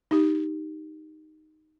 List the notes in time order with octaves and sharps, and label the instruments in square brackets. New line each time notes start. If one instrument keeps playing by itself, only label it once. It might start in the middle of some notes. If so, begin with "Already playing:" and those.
[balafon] D#4 G4